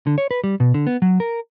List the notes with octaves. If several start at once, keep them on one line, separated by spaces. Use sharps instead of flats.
D3
C#5
B4
G3
B2
D3
B3
F#3
A#4